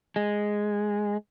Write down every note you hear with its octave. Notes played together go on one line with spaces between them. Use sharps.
G#3